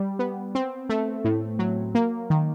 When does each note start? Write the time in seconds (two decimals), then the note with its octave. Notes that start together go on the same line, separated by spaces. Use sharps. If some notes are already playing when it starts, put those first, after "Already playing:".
Already playing: G3
0.19 B3
0.55 C4
0.89 A3
1.25 A2
1.59 F#3
1.95 A#3
2.30 D#3